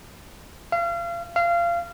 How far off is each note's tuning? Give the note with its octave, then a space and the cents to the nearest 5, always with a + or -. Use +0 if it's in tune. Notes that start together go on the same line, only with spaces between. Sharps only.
F5 -35
F5 -25